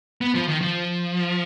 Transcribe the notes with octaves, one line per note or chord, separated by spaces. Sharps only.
B3
F3
D#3
F3